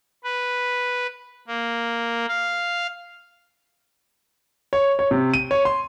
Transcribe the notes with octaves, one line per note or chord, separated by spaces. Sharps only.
B4
A#3
F5
C#5
C#5
C3
D#7
C#5
C6